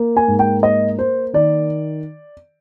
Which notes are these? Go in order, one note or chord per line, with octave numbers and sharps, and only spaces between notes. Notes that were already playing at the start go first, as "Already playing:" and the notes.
Already playing: A#3
G#5
G#2
G5
A#3 D#5
A#3 C5
D#3 D5